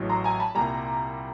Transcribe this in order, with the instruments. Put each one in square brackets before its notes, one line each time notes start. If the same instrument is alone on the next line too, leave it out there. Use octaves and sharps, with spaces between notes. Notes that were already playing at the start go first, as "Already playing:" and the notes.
Already playing: [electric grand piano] A1 A2 F#3
A#5 C6
G#5 A#5
A5 B5
C2 A#2 G3 G#5 A#5